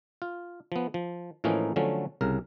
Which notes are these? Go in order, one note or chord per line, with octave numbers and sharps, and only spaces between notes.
F4
F3 B3
F3
A2 E3 F3 A#3 C#4 D#4
D3 F3 F#3 A3 C#4
C2 C#3 A#4